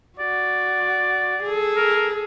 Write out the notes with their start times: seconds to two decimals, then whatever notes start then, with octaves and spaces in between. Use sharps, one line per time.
0.19 F#4 D5
1.43 G#4 A4
1.76 A#4